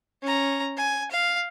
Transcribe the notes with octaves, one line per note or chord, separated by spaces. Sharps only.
C#4 A#5
G#5
F5